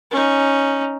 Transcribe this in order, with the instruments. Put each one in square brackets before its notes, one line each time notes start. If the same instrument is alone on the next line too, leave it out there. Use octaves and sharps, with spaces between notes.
[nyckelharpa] C#4 D#4